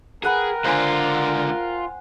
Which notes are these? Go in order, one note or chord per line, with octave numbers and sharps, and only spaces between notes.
G#4 A#4 B4 F#5 G5
C#2 D3 F4 C5 G#5 C6